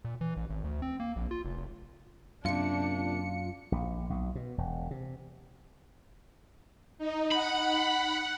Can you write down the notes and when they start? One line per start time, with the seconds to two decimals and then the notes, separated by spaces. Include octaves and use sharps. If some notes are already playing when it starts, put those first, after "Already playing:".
0.05 A#2
0.21 E3
0.37 A1
0.50 G#1
0.64 D2
0.82 C4
1.00 A#3
1.16 A#1
1.31 F4
1.45 F1
1.57 F1
2.45 F#2 C3 A#3 D4 F4 C#7
3.72 A#1
4.10 B1
4.35 B2
4.58 E1
4.91 C3
6.98 D#4
7.31 F#5 B5